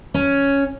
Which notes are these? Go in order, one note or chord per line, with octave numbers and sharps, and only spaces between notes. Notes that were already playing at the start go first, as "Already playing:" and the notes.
C#4